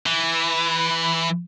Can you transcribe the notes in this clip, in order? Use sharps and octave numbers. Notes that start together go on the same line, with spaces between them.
E3